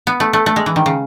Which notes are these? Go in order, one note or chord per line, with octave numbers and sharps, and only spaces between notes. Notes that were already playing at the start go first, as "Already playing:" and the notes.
B3
A3
A3
A3
G#3
E3
D#3
C#3